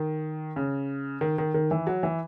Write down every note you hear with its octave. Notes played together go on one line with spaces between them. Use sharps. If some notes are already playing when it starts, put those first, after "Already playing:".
Already playing: D#3
C#3
D#3
D#3
D#3
E3
F#3
E3